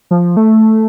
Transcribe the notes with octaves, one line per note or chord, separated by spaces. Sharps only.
F3
A3